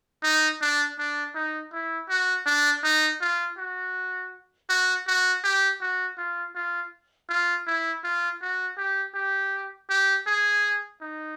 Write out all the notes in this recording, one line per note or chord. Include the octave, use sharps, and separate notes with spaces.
D#4
D4
D4
D#4
E4
F#4
D4
D#4
F4
F#4
F#4
F#4
G4
F#4
F4
F4
F4
E4
F4
F#4
G4
G4
G4
G#4
D#4